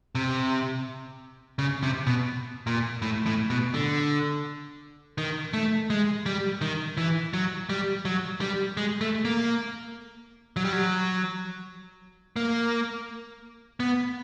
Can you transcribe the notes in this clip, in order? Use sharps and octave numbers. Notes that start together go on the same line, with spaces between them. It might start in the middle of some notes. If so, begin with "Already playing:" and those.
C3
C#3
C3
B2
A#2
A2
A2
B2
D3
D#3
A3
G#3
G3
D#3
E3
F#3
G3
F#3
G3
G#3
A3
A#3
F#3
G3
F#3
A#3
B3